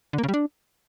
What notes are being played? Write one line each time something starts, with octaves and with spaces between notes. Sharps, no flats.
D3
A#3
C#3
G3
D4